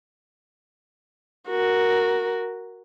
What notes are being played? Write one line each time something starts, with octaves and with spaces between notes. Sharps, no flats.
F#4 A#4